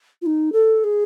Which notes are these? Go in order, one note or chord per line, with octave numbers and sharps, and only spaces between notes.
F4
D#4
A4
G#4